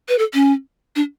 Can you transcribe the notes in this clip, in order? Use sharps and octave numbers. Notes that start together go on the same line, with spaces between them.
B4
A4
C#4
D4